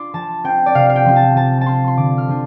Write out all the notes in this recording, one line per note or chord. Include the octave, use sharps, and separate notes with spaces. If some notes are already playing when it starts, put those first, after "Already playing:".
Already playing: D4 F4 C6 D6
F3 A5
C4 F4 G5
D5
C3 F5
F5
G5
F3 C4 F4
A5
F3 A5
A5
C4 F4 C6
C6
D3 D6
F6
F3 D4 F4